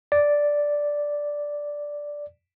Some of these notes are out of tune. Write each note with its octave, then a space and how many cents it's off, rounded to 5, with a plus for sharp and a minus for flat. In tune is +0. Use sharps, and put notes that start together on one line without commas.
D5 -5